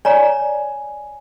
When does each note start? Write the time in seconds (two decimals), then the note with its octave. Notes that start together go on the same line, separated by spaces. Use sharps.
0.05 C#5 D5 G#5 A#5